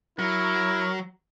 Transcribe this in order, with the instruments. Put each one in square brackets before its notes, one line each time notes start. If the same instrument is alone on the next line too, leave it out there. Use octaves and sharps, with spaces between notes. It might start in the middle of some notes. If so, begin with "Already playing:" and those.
[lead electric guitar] F#3 [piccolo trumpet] E4 [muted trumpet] A#4